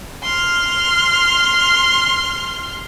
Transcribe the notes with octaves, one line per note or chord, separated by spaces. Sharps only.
C6 F6